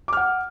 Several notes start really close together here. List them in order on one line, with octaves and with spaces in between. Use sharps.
D6 F6 F#5